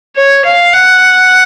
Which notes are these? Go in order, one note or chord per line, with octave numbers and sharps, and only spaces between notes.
C#5
F5
F#5